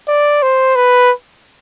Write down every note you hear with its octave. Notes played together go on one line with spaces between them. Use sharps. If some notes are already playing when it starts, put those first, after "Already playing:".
D5
C5
B4